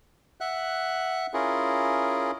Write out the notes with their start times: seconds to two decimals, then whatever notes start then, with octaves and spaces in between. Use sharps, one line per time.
0.41 E5 F#5 F#6
1.34 C#4 E4 F4 G#4 A#4